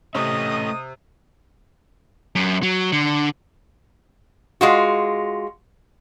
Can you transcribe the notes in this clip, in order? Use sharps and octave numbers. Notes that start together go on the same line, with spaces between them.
C3 A3 C#4 D#5 D#6
F#2
F#3
D3
G#3 F4 F#4